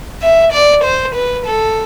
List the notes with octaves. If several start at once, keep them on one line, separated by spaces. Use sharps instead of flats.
E5
D5
C5
B4
A4